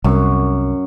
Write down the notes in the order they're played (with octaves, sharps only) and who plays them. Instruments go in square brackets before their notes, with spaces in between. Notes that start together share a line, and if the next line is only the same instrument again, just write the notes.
[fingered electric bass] C2 [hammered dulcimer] F#2